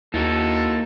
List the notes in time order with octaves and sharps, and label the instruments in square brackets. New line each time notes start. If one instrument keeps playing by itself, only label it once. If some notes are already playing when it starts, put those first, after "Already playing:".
[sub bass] D#2 [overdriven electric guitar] A#3 D#4 [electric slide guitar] E4 F#4 [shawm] A4